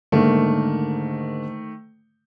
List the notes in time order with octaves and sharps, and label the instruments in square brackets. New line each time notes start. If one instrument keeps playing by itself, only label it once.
[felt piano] G#2 D3 A#3 [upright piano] D#3 A3